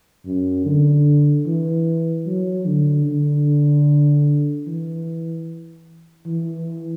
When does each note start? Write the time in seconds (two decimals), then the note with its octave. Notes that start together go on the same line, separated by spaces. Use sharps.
0.25 F#2
0.65 D3
1.46 E3
2.27 F#3
2.66 D3
3.06 D3
4.67 E3
6.27 E3